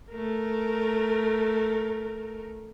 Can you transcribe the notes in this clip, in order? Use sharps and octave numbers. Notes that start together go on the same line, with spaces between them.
A3 A#4